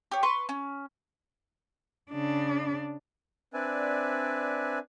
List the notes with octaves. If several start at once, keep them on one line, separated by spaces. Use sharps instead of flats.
G4 C#5
B4 C6 C#6
C#4
C#3 D4
C4 D4 B4 D5 E5 G#5